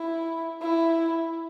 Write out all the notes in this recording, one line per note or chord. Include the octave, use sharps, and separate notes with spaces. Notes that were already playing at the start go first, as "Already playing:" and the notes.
Already playing: E4
E4